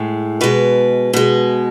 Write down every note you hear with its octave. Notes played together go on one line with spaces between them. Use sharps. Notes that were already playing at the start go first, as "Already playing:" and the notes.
Already playing: A2 G#3
B2 G#3 B4
B2 G#3